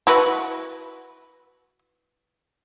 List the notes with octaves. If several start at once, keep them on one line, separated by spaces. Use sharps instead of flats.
E4 F#4 B4